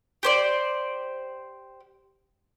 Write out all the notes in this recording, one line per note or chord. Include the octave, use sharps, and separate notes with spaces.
G4 C5 D5